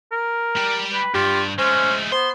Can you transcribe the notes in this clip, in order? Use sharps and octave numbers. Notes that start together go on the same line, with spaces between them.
A#4
G3 G4
B4
G2 F4 G4
G#3 A3 C#4 C5
B3 C5 C6